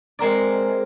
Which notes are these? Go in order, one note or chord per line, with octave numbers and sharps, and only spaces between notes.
G#3 C4 A#4 D5